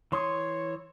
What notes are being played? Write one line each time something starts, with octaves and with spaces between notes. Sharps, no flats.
E3 C#5 C6 D#6